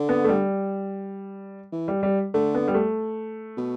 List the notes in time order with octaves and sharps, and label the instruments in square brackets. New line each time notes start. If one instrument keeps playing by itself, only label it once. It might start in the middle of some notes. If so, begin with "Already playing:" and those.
Already playing: [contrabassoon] D3
[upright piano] B3
A3
G3
[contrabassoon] E3
[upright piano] G3
G3
[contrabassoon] D3 [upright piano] A3
[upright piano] B3
G3
A3
[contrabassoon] B2